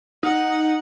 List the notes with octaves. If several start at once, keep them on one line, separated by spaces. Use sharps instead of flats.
D#4 F#5